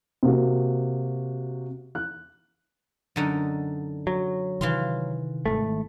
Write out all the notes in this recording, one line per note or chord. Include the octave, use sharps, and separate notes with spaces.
C3 A#3 F#4
F#6
F#2 D3 D#4
F#3
C3 D#3 E3 F5 C6
G#1 E2 A3